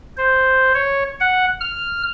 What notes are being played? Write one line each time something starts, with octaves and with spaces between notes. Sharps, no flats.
C5
C#5
F#5
F6